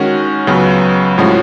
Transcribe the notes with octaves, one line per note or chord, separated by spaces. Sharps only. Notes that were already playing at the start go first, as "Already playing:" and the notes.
Already playing: D#3 G#3 C#4 F#4
C#2 C#3 F#3 B3
A2 F3 G#3 C#4 F#4